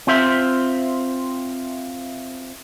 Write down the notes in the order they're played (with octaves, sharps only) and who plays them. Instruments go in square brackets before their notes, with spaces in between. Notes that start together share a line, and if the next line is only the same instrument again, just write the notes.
[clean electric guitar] C4 F4 C5 E5